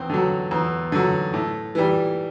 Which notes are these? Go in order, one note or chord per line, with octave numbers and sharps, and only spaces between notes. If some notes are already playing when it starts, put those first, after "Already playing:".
Already playing: E2 C4
D3 F#3
E2
D3 F#3
A2
E3 G3